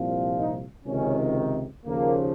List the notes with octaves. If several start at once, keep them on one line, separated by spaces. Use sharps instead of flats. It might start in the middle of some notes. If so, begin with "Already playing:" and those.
Already playing: C2 A#2 F3
D#4
C#2 C3 D#3 C#4
D#2 C#3 F3 A#3